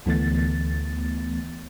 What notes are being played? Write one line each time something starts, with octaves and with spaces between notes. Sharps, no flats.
D2 E3 A3 B3 A6